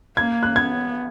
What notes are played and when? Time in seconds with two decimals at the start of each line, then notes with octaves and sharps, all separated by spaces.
0.17 A#3 G#6
0.43 F#6
0.56 B3 G#6